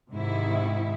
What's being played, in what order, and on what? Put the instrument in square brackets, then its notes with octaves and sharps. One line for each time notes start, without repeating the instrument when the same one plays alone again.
[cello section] G#2 C3 D#3 E4